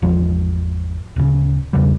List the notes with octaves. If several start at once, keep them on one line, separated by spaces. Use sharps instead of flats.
G#1 E2 F3 G#3
D1 C#3
B1 E2 C#3 G3